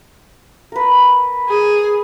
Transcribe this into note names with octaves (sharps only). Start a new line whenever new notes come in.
A#4 B4
G#4